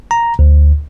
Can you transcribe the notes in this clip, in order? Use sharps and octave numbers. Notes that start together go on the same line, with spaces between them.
A#5
D2